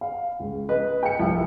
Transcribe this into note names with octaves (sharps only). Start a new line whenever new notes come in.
F5
C#2
B4 D#5
G5 C#7
C2 F3 E5